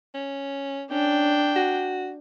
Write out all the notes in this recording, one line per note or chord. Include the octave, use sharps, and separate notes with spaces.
C#4
C#4 D4 G5
F#4